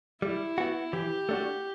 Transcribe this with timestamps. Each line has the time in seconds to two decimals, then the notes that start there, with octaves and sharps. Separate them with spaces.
0.22 G3 E4
0.58 B3 F#4
0.93 E3 G4
1.29 A3 D4 F#4